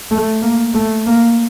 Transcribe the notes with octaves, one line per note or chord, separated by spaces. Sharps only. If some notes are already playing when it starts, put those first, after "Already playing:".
A3
A#3
A3
A#3